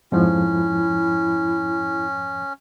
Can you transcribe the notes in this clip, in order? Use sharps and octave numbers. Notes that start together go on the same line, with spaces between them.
F2 G#2 F3 C#4 E4